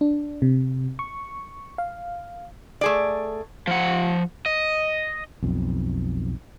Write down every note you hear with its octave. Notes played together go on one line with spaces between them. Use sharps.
D4
C3
C#6
F5
A3 G#4 D5
F3 F#5
D#5
B1 F2